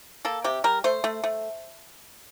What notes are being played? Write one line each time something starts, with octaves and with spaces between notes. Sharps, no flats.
A#3 A4
C3 G4
G3 A#4
A3 C5
A3
A3